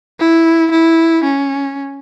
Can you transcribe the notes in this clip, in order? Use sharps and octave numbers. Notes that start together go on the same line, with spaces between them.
E4
E4
C#4